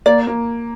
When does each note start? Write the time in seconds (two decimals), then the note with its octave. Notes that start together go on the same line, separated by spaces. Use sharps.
0.06 A#3 D5
0.27 A#3